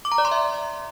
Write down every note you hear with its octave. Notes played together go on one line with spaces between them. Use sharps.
D6
A#5
D5
C6
E5